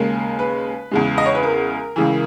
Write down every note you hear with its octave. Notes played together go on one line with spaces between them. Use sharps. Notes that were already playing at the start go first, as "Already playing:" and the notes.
Already playing: D#2 C#3 G#3 A#4
B4
E2 C#3 G#3
D#5
C#5
B4
A#4
C#2 C#3 E3